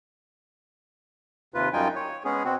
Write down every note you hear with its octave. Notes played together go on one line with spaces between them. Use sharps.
D#2 C3 F4 B4
F#2 G3 D#4 F4 G5 G#5
C#5
G#3 B3 C#4 G#4
B2 C4 F#4